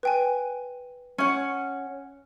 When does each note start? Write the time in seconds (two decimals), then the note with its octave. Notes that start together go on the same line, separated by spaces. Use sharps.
0.03 B4 G5 G#5
1.18 C#4 F#5